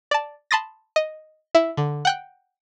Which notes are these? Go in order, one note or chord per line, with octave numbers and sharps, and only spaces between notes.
D5 A5
A5 B5 C6 D#6 A6 A#6
D#5
E4
D3
F#5 G5 F#6